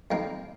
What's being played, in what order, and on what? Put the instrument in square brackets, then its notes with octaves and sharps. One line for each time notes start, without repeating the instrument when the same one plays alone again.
[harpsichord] F2 D#3 A#3